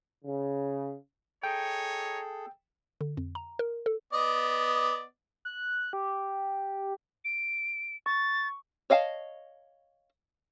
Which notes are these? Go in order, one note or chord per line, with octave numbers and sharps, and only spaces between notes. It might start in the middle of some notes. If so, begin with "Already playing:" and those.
C#3
D#4 G#4 A4 C#5 G5
D3
F2
A#5
A#4
A4
B3 D5 D#5
F#6
G4
D7
C#6 A6
C#5 D#5 F5 G5 A5